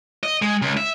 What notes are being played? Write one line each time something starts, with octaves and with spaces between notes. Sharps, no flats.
D#5
G#3
C#2
E5